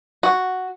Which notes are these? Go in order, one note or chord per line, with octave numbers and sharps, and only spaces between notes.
F#4